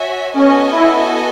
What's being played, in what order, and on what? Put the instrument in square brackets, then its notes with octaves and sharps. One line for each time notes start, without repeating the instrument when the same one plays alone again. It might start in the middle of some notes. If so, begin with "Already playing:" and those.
Already playing: [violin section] F#4 C#5 E5 G#5
[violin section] B3 F#4 A4 D#5 G#5 [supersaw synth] C#4
[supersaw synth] E4